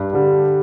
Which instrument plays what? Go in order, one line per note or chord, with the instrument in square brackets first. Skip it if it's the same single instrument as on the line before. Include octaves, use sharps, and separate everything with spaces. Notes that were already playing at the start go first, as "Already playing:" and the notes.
Already playing: [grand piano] G2
D3 G3